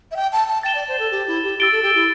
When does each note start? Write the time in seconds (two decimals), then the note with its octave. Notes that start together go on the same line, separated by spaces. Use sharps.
0.11 E5
0.16 G5
0.33 A5
0.48 A5
0.63 G5 A6 E7 G7
0.75 D5
0.88 C5
0.99 A4
1.11 G4
1.27 E4
1.44 G4
1.59 G4 E6 A6 D7 G7
1.72 A4
1.83 G4
1.95 E4